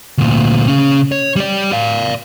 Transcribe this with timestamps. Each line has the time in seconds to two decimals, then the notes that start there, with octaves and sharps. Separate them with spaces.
0.18 D2 A#2
0.68 C#3 C#4
1.12 C#5
1.36 G3 D5
1.72 D5 F5